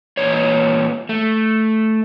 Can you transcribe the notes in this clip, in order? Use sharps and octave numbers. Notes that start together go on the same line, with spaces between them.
A#2 E3 B4 C#5
A3